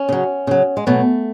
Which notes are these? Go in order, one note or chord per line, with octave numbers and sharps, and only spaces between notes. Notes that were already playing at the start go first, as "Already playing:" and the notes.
Already playing: C#4
C#3 F#3
C#3 F#3
G#3
B2 F#3 A3